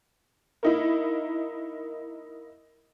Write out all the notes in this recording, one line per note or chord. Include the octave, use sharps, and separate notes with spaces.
A#3 D#4 E4